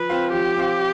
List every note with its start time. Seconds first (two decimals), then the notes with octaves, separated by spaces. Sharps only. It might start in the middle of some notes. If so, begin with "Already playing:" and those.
Already playing: F3 B4
0.09 C4 F4 C5 F5
0.33 F3 G4
0.56 C4 F4 C5 F5